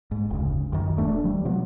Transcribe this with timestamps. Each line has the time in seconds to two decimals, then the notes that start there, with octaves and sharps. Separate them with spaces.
0.11 G#2
0.31 F1 D2 C#3
0.73 F#2 D#3
0.97 D#1 A3 C#4 D4
1.24 F3 G3
1.45 B2 F3 F#3 B3